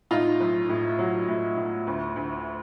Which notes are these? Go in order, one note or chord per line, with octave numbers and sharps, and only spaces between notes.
A2 D#4 F4
B1
A2
F#3
A2
A2
D2
D2